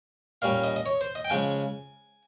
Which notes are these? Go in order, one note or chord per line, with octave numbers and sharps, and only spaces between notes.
A#2 G3 C#4 F5
D#5
D#5
C#5
C5
D#5
G5
C#3 F3 G#3 G#5